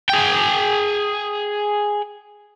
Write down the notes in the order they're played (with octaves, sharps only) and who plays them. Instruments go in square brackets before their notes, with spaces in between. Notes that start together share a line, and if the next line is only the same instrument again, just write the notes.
[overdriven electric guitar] G#4 G5